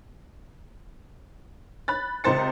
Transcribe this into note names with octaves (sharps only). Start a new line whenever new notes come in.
B5 F#6 A6
C#2 C3 A#4 C5 A6 C#7